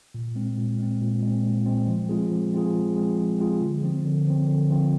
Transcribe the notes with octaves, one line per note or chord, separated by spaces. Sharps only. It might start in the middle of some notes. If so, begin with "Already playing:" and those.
A#2
G#3 C4
A#2
G#3 C4
A#2
G#3 C4
A#2
G#3 C4
F3
G#3 C4 F4 G#4
F3
G#3 C4 F4 G#4
F3
G#3 C4 F4 G#4
F3
G#3 C4 F4 G#4
D3
F3 C4
D3
F3 C4
D3
F3 C4